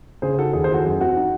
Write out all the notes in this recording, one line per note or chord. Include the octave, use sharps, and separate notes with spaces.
C#3 G#4 C5
D#4 F#4 A4
D#2 G#4
G#4 C5
E3 F#4 A4
F#2 G#4
C4 F#4
D#4